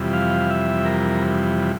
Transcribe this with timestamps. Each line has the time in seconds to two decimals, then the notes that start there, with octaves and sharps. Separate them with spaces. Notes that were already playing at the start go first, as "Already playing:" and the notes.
Already playing: F2 C3 E3 G3
0.13 F5
0.50 E5
0.85 A#4